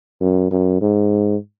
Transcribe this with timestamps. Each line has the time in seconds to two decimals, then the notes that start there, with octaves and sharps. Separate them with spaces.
0.21 F#2
0.51 F#2
0.81 G#2